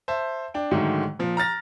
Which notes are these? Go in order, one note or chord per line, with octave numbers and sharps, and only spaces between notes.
C5 E5 A5
D4 G5
G#2 D3 D#3 F#3 A3
A#2 F3
A#5 F6 A6 A#6